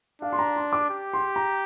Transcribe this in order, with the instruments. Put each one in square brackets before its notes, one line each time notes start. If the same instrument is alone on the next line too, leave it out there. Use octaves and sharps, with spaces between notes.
[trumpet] D4 [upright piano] F5
[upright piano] C6
A#5
C6
D6
[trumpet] G4
[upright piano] C6
A#5